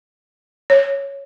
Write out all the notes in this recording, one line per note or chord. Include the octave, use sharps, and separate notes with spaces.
C#5